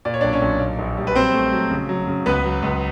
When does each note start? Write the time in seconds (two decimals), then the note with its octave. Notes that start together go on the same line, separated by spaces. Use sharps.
0.05 A#2 D5
0.14 C#5
0.21 D4 D5
0.24 B1
0.33 C#4 C#5
0.42 B1
0.60 A#2
0.79 A#1
0.97 G3
1.07 B4
1.16 F#3 C4 C5
1.34 A3
1.53 F#3
1.71 C#3
1.89 F#3
2.07 C#3
2.26 C#2 B3 B4
2.45 F#3
2.62 C#2